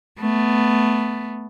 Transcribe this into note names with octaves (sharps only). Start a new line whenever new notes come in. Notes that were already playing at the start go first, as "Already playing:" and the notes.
A3 B3